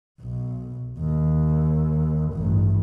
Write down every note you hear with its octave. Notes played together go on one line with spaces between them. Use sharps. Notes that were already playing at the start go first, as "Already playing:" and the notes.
B1
D#2
A1 G2